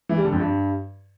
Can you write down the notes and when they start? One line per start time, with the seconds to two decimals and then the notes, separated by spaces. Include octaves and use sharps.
0.09 E3
0.17 G3
0.25 D3
0.32 F2
0.40 G2